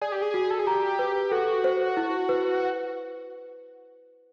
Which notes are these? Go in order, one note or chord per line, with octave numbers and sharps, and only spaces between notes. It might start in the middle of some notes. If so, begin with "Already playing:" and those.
G#4 D5
G4
G#4
F#4
A4
G#4
G4 A#5
B4
F#4 A4
C5
E4
B4